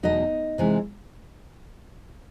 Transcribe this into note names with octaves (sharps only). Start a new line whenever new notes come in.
E2 B2 F#3 A3 D#4 D#5
C3 E3 G#3